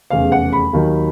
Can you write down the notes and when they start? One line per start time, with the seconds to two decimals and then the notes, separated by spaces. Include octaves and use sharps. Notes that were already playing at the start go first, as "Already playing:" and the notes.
0.10 F1 E2 C#3 F5
0.32 F#5
0.53 B5
0.73 D#2 D#3 F#3